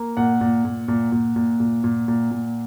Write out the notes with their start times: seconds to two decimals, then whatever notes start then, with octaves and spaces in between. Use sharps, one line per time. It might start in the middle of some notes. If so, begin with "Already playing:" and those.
Already playing: A#3
0.17 A#2 F#5
0.41 A#2
0.65 A#2
0.88 A#2
1.12 A#2
1.36 A#2
1.60 A#2
1.84 A#2
2.08 A#2
2.31 A#2